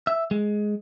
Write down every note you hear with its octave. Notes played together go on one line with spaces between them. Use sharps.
E5
G#3